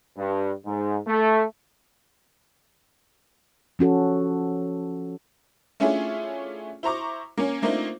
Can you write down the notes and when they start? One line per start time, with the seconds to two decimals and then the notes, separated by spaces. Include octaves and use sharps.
0.17 G2
0.65 G#2
1.07 A3
3.79 F3 C#4 F#4 A4
5.80 A3 C#4 D4 E4 F4 G#4
6.83 E4 C5 A#5 C#6 D6
7.38 A#3 C#4
7.62 A3 A#3 C4 D4 D#4 F4